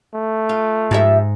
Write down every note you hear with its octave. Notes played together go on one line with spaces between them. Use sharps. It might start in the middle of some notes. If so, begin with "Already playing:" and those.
A3
F4
G#2 F3 G4 E5